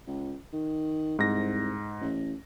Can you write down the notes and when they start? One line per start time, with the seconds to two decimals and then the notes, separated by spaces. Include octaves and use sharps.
0.07 C#2
0.53 D#3
1.19 C2 G#2 A#6
2.01 A1